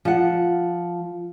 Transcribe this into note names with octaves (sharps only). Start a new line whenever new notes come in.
F3 F#5